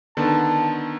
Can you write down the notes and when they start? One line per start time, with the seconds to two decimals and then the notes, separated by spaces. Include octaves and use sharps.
0.17 D3 D#3 B3 A5